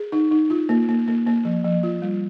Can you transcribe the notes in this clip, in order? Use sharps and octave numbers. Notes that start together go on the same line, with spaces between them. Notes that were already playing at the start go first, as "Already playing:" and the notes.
Already playing: G#4
D#4
D#4
F4
A#3
A#3
A#3
A#3
F3
F3
F4
G3